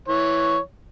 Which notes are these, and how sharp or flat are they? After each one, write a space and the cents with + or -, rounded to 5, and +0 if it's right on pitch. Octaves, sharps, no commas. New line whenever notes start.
E3 +0 C#5 +0